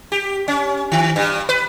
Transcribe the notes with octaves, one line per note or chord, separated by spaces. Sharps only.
G4
C#4
D#3
G2
B4